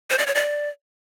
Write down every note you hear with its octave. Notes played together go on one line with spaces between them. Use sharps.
C5
D5
C#5
D5